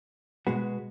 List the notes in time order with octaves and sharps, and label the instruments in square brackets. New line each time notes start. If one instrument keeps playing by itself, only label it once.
[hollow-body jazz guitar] B2 G#3 B3 F#4